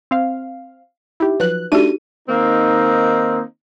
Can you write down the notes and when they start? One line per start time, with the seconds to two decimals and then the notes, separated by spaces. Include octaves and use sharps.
0.11 C4 F5
1.20 D#4 E4 G4
1.40 F3 F#3 B4 F#6
1.72 A3 D4 D#4 F#4 G4 D#7
2.28 D#3 A#3 C4 D#4